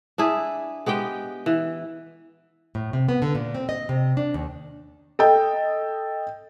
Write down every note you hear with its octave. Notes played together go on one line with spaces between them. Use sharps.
D4 E4 G#4
G#3 B3 G4 G5
E3
A2
C3
B3
D3
A#2
C4
D#5
C3
D4
D#2
A4 D#5 G5